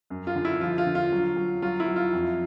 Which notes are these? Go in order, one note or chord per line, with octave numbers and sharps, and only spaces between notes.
F#2
F4
D3
E4
F3 F4
F4
D3
F4
F#3
F#3
F#3 F4
E4
F#3
F4
F2